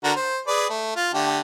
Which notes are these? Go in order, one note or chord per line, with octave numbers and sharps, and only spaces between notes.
D3 F#4 A#4
C5
G#4 B4 D5
A3
F4
D3 A3 G4